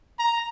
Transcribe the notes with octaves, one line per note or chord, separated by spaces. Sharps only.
A#5